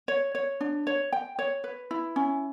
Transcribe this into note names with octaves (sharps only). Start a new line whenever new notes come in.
C#5
C#5
D4
C#5
G5
C#5
B4
E4
C#4